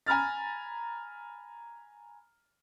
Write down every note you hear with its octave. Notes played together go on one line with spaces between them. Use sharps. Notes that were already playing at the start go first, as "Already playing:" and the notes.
G#5 A#5 B5 F6 A6